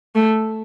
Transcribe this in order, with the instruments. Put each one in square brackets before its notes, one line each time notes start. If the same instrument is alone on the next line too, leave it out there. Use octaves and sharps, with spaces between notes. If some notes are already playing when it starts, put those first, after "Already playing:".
[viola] A3